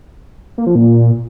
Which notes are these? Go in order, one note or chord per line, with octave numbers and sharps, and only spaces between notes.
A#3
F3
A#2